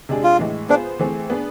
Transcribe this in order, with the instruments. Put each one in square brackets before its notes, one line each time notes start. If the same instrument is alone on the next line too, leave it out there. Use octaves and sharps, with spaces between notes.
[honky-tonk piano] C3 G#3 D4 G#4
[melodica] F4
[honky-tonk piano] A2 E3 G#3
[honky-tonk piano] B3 F4 G#4 C5 [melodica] D4
[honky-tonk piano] E3 A3 C4 G#4
B3 D4 G#4